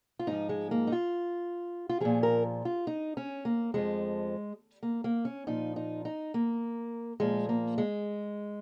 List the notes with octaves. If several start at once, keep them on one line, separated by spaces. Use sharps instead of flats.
F4
G#2 F3 D#4
G#3
A#3
D#4
F4
F4
A#2 F3 G#4
A#4
F4
D#4
C#4
A#3
F2 F3 G#3
A#3
A#3
C#4
A#2 F3 D#4
D#4
D#4
A#3
A#2 F3 G#3
A#3
G#3